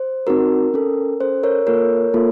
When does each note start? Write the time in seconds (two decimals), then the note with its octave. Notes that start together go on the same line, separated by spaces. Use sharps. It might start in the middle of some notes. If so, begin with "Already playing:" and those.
Already playing: C5
0.27 C4 D#4 F#4 A#4
0.74 C#4 A4
1.21 C#4 A4 C5
1.43 A#4 C#5
1.67 A#3 F4 A4 A#4 C#5
2.14 A#3 F4 A4